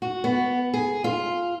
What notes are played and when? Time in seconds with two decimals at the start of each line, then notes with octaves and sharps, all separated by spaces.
0.02 F#4
0.24 B3
0.74 G#4
1.04 F4